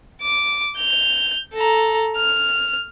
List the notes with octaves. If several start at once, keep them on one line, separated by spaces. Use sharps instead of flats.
D6
G6 F7
A4 A#5
F6